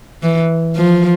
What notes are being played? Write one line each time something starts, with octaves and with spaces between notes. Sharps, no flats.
E3
F3